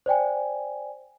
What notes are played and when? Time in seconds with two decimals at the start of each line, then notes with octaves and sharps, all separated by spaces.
0.06 C5 D5 G5 G#5